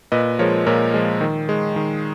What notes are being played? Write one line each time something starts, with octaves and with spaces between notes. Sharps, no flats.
A#2 B4 D#5
F3 G#3 A#4 C#5
A#2 A#4 C#5
F3 G#3
D#3
G#3
D#3